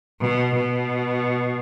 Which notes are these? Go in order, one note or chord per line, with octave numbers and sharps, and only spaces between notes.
B2
B2